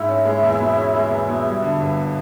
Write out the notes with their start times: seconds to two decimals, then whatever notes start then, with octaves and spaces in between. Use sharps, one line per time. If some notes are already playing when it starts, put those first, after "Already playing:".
Already playing: G#2 E4
0.09 C#4
0.25 G#3
0.43 E2
0.60 B2
0.77 C#4
0.94 G#3
1.11 E2
1.28 B2
1.46 G3
1.62 D3
1.80 G1